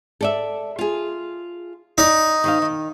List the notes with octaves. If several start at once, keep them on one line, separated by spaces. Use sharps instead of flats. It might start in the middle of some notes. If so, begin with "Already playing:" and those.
A4 D5 E5
F4 G#4
D#4 D5
D#3 C5 F5
D#3